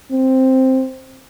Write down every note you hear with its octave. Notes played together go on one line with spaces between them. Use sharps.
C4